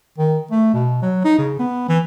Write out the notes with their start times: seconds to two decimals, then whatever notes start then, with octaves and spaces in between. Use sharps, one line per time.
0.18 D#3
0.51 A3
0.74 B2
1.02 F#3
1.25 D#4
1.38 C#3
1.59 B3
1.89 E3